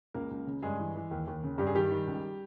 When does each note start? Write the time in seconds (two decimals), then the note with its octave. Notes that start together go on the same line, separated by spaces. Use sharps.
0.14 C#2 A#3 A#4
0.31 C#2
0.47 C#3
0.62 G2 G#3 G#4
0.79 E3
0.95 E3
1.11 D#2
1.27 D#2
1.43 C#3
1.58 G2 G4
1.67 G#4
1.74 D#3 G3 G4
1.91 D#3
2.07 C#2